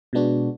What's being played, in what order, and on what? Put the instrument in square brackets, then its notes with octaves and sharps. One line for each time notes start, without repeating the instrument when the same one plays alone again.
[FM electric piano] B2 G#3 B3 D4 F#4